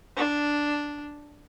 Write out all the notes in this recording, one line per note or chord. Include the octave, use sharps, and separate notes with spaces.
D4